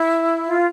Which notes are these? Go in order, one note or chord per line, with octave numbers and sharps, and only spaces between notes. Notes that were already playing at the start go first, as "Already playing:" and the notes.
Already playing: E4
F4